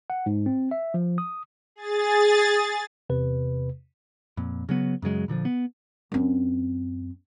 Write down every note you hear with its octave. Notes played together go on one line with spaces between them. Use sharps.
F#5
G#2
C4
E5
F3
D#6
G#4 A6
E2 C3 B4
F2 A#2
C#3 F#3 B3
F#2 C#3 F#3 G#3
A#2 D3 E3 F3
B3
F#2 C4